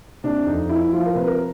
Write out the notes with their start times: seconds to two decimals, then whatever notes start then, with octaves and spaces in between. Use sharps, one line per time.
0.24 C3 D4
0.46 F2 D#4
0.69 F3 E4
0.93 F3 F4
1.06 A#4
1.15 C3 B4
1.27 A#4